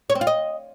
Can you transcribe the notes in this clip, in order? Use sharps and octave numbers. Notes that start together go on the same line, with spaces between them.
C#5
C4
F4
D#5